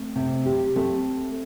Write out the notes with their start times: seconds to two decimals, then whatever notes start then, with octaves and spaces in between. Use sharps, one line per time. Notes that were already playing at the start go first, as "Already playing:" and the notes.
Already playing: A3 C4
0.16 C3 C4
0.46 G4
0.76 A3 C4